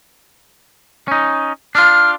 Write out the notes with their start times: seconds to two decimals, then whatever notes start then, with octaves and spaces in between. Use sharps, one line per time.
1.08 C#4 D#4
1.75 D4 F4 F6